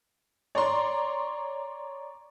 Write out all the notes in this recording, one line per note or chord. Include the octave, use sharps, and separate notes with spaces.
C#5 D5 A#5 C6